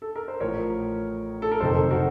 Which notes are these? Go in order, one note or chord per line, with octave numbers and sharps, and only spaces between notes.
A4
A#4
C5
A1 A2 F3 A#4 C#5
A4
A#4
F#1 F2 C3 D#3 A4 C5
F#4 A#4